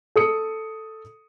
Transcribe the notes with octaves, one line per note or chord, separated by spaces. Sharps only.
A4 D#6 C#7